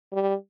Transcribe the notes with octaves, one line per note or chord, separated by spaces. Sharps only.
G3